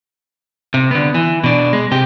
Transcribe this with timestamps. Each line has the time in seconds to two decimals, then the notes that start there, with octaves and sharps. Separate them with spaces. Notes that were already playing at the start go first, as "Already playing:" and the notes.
0.74 C3
0.91 D3 B3
1.14 E3
1.44 B2 D4
1.73 G#3
1.91 C3 G4